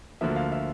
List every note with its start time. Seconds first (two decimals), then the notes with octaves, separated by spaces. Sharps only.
0.21 D2 D3 F3 A#3 E5
0.36 F5
0.52 E5